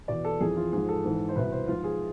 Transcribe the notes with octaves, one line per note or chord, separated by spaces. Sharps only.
E2 B2 D5
A4
F2 E3 G#4
F4
G#2 F3 G#4
A4
G#2 E3
C5
C2 B2 B4
C5
G#2 F3 F4
G#4